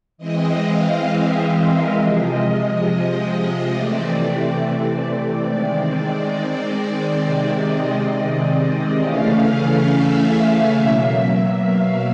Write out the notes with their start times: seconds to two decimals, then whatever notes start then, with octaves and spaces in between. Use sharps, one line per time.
0.18 E3 G#3 C4 D#5
0.62 F5
1.06 E5
1.36 C5
1.65 A#4
1.94 C3 F3 G#3 D#5
3.71 C3 E3 A3 C4 D5
5.47 D#3 G#3 C4 D5
7.23 C3 D#3 G#3 C4 D5
7.67 D#5
8.99 C#3 E3 A3 C#4 F5
9.88 E5
10.75 B2 F#3 A#3
11.65 F5